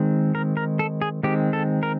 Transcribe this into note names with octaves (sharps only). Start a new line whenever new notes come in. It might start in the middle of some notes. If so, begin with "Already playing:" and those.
Already playing: D#3 G#3 C4
A#4
A#4
A4
G#4
D#3 G#3 C4 G4
A4
A#4